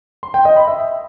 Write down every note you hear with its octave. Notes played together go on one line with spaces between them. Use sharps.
C6
G5
D#5
B5
E5